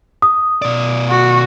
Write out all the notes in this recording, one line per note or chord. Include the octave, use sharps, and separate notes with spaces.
D#6
B2 D5
F#4